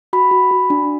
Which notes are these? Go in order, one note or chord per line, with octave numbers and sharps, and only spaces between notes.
F#4 B5
F#4
F#4
D4